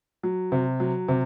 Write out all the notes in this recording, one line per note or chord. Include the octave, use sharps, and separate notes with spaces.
F#3
C3
F#3
C3